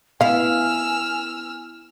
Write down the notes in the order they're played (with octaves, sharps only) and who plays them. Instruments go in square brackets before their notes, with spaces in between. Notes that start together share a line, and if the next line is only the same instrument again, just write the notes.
[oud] B3 E4 [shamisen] F5 [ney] G#5 [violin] E6 F6